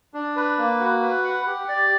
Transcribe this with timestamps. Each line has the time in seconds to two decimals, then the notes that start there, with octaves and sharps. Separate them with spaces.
0.14 D4
0.36 B4
0.58 A#3
0.80 F#4
1.02 B4
1.24 F#5
1.47 G4
1.69 D5